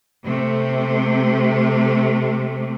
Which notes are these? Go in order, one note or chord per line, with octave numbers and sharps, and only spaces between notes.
C3 A3